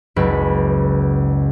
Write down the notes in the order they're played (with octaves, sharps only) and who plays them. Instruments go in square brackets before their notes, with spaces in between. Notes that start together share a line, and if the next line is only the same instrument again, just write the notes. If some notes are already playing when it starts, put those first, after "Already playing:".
[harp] F#1 C#2 B4